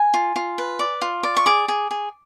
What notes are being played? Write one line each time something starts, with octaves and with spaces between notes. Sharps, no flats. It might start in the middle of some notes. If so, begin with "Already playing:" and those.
Already playing: G#5
F4
F4
B4
D5
F4
D5
C#6
G#4 D6
G#4
G#4